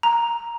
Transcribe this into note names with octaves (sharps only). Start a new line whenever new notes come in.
A#5